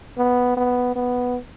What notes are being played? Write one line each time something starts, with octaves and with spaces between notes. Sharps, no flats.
B3
B3
B3